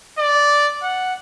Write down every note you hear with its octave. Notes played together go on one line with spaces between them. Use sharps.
D5
F#5